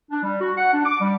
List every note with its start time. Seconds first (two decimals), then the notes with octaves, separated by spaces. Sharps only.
0.11 D4
0.23 G3
0.41 F#4
0.57 F#5
0.74 D4
0.86 D6
1.01 G3